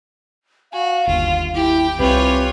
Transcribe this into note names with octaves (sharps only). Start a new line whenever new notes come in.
F#4 F5 G#5
G1 D#2 F4
E4 G4 G5
C2 E3 C4 F4 G4 B4 C#5 G6